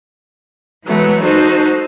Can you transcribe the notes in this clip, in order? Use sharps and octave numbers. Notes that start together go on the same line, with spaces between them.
E3 F#3 G#3 A3 B3
D#4 F#4 A4 C5